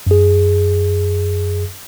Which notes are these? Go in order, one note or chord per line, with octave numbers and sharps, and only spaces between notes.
F#2 G#4